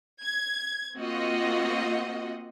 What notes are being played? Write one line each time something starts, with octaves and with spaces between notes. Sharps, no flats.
G#6
A#3 C4 F4 F#4 D#5